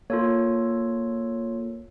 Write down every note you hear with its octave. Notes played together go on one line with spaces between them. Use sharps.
A#3 F4 A4 C#5